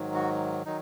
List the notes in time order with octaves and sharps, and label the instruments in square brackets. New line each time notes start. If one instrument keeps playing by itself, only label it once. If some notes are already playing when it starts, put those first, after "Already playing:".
Already playing: [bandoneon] G#2 D#3 F#3
F#4
D#3 F#3 D#4